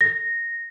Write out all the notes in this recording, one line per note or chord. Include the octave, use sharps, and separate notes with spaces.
A#6